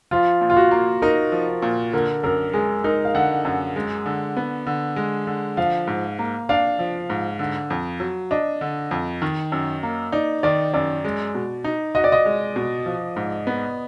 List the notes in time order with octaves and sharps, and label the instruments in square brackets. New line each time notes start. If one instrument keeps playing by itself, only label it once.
[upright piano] F3 [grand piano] F4
[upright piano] A#2
[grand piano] F4
F#4
[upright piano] A#3
[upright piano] D#4 [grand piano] A#4
[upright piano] F3
A#2
[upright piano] D3 [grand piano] A#4
[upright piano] F#2 [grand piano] A#4
[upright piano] G#3 [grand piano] G#4
[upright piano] D#4 [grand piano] A#4
[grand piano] F5
[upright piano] D3 [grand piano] F#5
[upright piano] F#2 [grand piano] F#5
[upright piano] G#3
D3
B3
D3
G#3
D3
[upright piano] F3 [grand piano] F5
[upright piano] G#2
A#3
[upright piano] D4 [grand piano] F5
[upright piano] F3
G#2
D3
F2
F#3
[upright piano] D4 [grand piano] D#5
[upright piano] D3
F2
D#3
F#2
A#3
[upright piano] D#4 [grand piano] D5
[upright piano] D#3 [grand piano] D5
[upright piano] F#2 [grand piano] D5
[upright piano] G#3
B2
D#4
[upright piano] F#4 [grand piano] D#5
[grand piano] D5
D#5
[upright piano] G#3
B2
F3
G#2
B3